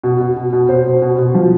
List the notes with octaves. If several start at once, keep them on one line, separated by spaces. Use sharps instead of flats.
B2
B2
B2
B2
B2 C5
B2
B2
B2
F3